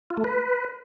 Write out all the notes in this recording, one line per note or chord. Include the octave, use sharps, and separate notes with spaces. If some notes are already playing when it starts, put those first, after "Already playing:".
F4
A3
B4